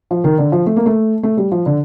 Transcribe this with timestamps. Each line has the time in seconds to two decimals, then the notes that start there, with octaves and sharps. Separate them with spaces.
0.11 F3
0.24 D#3
0.38 D3
0.52 F3
0.66 A3
0.76 A#3
0.86 A3
1.23 A3
1.37 G3
1.52 F3
1.66 D3